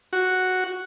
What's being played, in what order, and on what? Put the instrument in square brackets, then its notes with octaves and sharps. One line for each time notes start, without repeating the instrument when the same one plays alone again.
[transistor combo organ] F#4